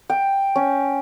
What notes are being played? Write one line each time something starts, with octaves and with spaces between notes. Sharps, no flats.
G5
C#4